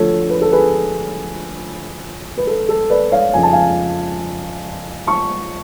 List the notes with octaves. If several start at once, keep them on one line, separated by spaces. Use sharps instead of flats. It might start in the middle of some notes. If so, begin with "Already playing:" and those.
Already playing: D2 D3 F3 A4 C#5
B4
A4
G#4 B4
B4
A4
A4
B4 D5
C#5 F5
F2 C#3 F3 G#5
A5
F5 G#5
A5 C#6